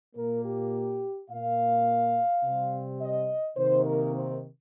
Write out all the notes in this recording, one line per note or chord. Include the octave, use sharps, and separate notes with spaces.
A#2 A#3 A#4
G4
A#2 A#3 F5
C3 G3 C4
D#5
C3 D#3 A#3 C5
A#4
C4